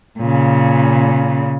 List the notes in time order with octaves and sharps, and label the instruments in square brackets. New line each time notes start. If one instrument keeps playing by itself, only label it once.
[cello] A#2 C#3